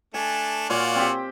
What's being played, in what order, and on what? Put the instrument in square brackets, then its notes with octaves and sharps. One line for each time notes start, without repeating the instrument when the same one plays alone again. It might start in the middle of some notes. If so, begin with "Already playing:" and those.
[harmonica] A3 D4 [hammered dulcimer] G#5
[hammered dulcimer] A#2 C#5 [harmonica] F4 F#4 D5
[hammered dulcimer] C4 G4